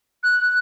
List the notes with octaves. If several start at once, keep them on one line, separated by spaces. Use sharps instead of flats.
F#6